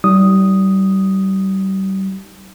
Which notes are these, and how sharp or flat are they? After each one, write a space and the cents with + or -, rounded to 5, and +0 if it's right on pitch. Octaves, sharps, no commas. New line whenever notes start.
G3 -35 D#4 +20 D#6 +0